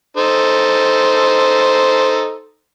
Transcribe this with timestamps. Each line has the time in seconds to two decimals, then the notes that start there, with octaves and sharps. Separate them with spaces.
0.17 D#4 A4 C5